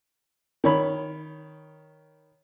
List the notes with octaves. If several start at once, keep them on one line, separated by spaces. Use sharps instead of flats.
D#3 C#5 B5